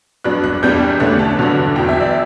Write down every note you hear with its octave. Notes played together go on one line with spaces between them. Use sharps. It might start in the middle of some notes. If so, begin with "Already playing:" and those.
G2 F#3 B3 D4 F#6
F#6
E2 B2 G3 B3 D4 G6
E2 D3 A3 C#4 F#6
A5
G2 D3 F#3 B3 D4
E2 B2 F#3 G5
E5
D5